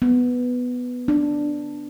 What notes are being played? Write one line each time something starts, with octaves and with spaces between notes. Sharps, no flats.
B3
D4